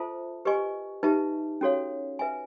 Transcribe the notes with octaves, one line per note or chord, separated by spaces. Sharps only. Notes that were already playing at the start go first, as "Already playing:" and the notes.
Already playing: F4 A4 C5 E5 A5
G4 B4 D#5 G#5 C#6
D#4 G4 B4 E5 A5
C#4 F#4 A4 C#5 F5
B4 E5 G#5